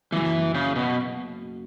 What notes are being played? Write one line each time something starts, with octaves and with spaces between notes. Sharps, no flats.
F#1 F#2 E3 F#3
C#3
B2